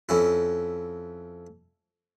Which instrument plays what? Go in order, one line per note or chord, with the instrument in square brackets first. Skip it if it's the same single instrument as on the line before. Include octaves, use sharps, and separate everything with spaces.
[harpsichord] F2 C#4 E4